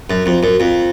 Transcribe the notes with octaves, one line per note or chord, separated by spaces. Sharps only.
F#2
F2
F#2
F2